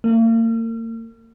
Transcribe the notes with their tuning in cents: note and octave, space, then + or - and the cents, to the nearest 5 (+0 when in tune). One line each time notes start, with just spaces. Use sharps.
A#3 -40